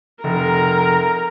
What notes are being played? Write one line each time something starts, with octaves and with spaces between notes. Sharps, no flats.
F1 A#4 A#5